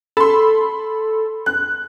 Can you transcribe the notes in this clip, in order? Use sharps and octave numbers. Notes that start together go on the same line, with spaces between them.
A4 B5 C6
F#6